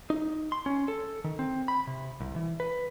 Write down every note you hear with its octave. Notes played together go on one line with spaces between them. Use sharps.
D#4
C6
C#4
A4
D#3
C4
B5
C3
C2
E3
B4